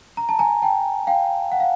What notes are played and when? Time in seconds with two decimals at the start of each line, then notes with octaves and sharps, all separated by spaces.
0.17 A#5
0.29 A5
0.39 G#5 A#5
0.62 G5 A5
1.07 F5 G5
1.52 F#5
1.60 F5